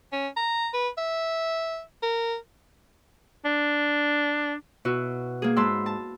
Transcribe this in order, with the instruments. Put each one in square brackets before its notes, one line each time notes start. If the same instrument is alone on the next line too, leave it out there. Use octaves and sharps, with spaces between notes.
[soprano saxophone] C#4
A#5
B4
E5
A#4
D4
[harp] B2 E4 F#4
A#3 G#4
G#2 A5 B5 C6 E6
A5